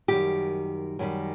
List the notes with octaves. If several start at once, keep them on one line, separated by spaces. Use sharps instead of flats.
F#2 D#3 G3 G4
F#2 D#3 G3